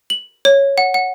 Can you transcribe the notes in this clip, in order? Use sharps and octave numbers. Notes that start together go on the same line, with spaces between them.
F#7
C#5
F#5
F#5